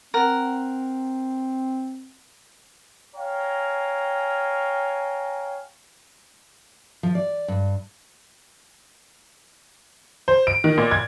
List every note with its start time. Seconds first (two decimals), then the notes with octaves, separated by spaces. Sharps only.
0.14 C4 A#4 F#5
3.16 C#5 F5 G5 G#5 A#5
7.03 F3
7.15 D5
7.48 G2
10.28 C5
10.47 D7
10.64 D#3
10.78 A#2
10.91 G#6